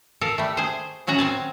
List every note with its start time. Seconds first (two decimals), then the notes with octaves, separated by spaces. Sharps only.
0.21 A4 A#4 F5
0.38 G3 A3
0.57 G#4 C5
1.07 A2 F#3 C#4 F#4 A#5
1.19 F#3 C4 G#5 A5